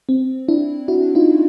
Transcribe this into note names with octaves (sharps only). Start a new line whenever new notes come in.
C4
D4 E4
E4 F#4
D#4 F4